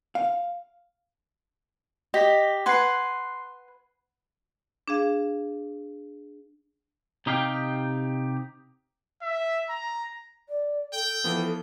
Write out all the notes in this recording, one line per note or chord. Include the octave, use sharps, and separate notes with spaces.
F5
G4 D#5 B6
B4 F#5 G#5 C6 C7
D4 G#4 F5
C3 D#4 G4 F5 G5
E5
A#5
D5
A4 G5
E3 F3 B3